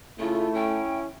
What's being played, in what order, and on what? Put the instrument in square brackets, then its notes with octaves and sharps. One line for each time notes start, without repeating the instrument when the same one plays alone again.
[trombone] C#3 [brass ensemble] A3 [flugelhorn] E4 [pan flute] F4
[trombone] C#4 [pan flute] G5